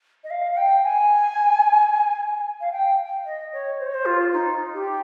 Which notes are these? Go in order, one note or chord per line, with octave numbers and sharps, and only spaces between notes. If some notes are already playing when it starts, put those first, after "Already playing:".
D#5
F5
F5
G5
G#5
F5
G5
D#5
C#5
C5
C#5
C5
F4
D#4
G4